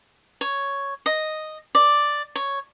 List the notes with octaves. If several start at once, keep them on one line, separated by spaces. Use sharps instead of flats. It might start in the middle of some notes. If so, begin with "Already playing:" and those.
C#5
D#5
D5
C#5